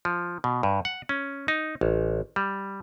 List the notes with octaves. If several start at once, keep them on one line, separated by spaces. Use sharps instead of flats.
F3
B2
G2
F#5
C#4
D#4
A1
G3